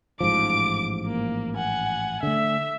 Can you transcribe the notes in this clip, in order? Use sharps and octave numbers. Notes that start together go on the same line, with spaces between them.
A1 G#2 F3 D6 D7
A#3
F#5 G#5
D3 A3 E5